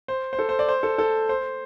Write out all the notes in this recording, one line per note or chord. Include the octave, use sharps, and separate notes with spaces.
C5
C5
A4
C5
D5
C5
A4
A4
C5